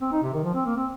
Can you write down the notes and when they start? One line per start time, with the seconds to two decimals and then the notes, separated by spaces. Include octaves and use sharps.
0.01 C4
0.12 D#4
0.23 C3
0.34 D#3
0.44 F3
0.54 C4
0.66 A#3
0.77 C4